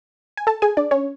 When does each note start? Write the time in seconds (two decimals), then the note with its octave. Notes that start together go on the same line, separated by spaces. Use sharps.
0.37 G#5
0.47 A4 A5
0.62 G#4 G#5
0.77 D4 D5
0.91 C#4 C#5